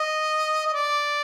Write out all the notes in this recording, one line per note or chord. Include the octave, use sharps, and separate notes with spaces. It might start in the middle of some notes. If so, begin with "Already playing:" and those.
Already playing: D#5
D#5
D5